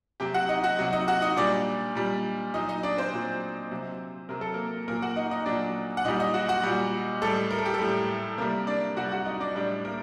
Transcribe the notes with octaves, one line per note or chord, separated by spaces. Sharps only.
C3 F#3 G4 G5
F#4 F#5
D#4 D#5
F#4 F#5
C3 F#3
D#4 D#5
F#4 F#5
D#4 D#5
A#2 G3 D4 D5
A#2 G3
A#2 F#3 D#4 D#5
D#4 D#5
D4 D5
C4 C5
A#2 F#3
C3 F#3
C3 F#3 A#4
A4
A#3 A#4
A#2 F#3 A#3 A#4
F#4 F#5
D#4 D#5
D#4 D#5
A#2 F#3 D4 D5
F#5
A#2 G3 D#4 D#5
D#4 D#5
F#4 F#5
F#4 F#5
A#2 G3
A2 G3 A4
A#4
A4
G4
A4
A2 G3
C3 G3 A#3 A#4
D4 D5
C3 G3 F#4 F#5
F#4 F#5
D#4 D#5
D4 D5
A2 G3 D4 D5
A#3 A#4